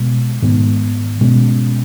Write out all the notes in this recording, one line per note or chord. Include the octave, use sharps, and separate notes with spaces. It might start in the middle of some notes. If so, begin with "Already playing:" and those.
Already playing: B2 G#3
G#2 D#3 B3
B2 G#3 C#4